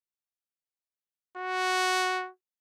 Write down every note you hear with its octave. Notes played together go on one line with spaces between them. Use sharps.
F#4